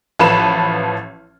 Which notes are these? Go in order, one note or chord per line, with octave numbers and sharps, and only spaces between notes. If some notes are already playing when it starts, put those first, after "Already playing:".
A1 F3 B4 A5 B5 E7